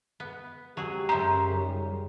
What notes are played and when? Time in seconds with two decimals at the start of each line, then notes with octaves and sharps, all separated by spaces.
0.20 B3
0.77 F#3 G#3 G4 G#4
1.09 F#2 C#3 C5 E5 A#5
1.54 D#3 G3